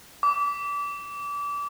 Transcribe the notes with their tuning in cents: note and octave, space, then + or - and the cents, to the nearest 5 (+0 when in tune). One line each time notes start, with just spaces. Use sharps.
D6 -30